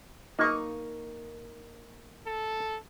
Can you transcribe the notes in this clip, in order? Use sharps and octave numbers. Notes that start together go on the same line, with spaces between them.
A#3 D#4 C#6 D#6
A4